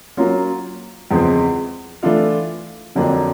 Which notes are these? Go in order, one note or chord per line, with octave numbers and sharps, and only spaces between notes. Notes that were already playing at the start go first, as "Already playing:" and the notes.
F#3 A#3 C#4 F4
E2 C#3 F3 G#3 C4
E3 A3 D4 F4
F2 D3 F#3 A#3 D4